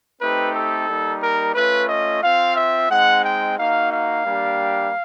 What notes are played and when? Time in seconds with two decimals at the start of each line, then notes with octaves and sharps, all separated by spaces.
0.21 A3 C4 D#4 G4 B4
0.55 A4
0.87 G3 A#3 D#4
1.21 A#4
1.55 A3 C#4 F4 B4
1.89 D#5
2.23 C4 F4 F5
2.56 E5
2.90 G#3 C4 D#4 F#5
3.25 G5
3.58 A#3 D#4 F#4 F5
3.92 F5
4.25 G3 A#3 D4 G4